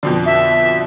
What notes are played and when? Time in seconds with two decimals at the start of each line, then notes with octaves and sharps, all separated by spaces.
0.03 F2 B2 D3
0.26 E5